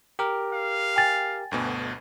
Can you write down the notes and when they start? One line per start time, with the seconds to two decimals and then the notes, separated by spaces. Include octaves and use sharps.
0.19 G4 A#4
0.53 F5
0.96 G5 G#5 A6
1.51 G1 D2 B2